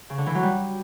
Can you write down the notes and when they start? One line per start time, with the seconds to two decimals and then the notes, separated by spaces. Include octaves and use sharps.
0.10 C#3
0.18 D3
0.26 E3
0.35 F#3
0.43 G3